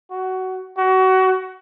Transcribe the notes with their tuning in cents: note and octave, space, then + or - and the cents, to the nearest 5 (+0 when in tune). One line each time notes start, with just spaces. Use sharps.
F#4 +15
F#4 +25